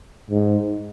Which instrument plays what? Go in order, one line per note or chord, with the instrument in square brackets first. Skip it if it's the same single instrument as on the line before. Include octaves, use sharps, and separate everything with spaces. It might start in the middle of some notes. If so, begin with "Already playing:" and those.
[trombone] G#2